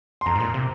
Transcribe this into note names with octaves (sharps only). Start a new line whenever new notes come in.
C6
F2 A#5
G#2
A#2
C3